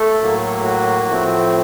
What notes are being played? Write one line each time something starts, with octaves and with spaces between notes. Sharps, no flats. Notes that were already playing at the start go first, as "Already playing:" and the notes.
Already playing: A3 A4
A2 F#3 A#3
F#4
A2 F3 A3 C4